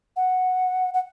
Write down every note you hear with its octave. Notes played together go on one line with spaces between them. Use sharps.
F#5
F#5